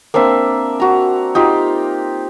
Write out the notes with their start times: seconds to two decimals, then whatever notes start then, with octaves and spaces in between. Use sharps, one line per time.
0.14 A#3 C4 D4 E5
0.80 F#4 A#5
1.35 D#4 F4 G4